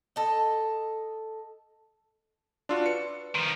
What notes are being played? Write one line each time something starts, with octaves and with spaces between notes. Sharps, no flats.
A4 D#5
D4 F4 F#4 D5 C6 E6
B4 C#7
D#3 F3 C6